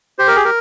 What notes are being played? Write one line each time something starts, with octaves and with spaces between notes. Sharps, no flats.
G4 C5
A#4
G#4
A#4